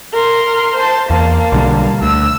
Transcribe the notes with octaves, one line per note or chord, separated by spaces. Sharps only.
A#4 C6
C5 A5
E2 A#3 A5
B1 D3 G3
D2 E6